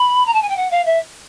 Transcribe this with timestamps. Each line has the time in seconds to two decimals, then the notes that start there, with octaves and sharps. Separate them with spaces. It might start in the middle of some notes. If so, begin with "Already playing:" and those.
Already playing: B5
0.26 A#5
0.33 A5
0.42 G#5
0.49 G5
0.56 F#5
0.71 F5
0.85 E5